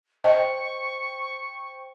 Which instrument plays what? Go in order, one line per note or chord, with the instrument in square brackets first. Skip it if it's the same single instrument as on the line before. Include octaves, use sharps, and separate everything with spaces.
[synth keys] C5 G5 [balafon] D#5 [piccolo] C#6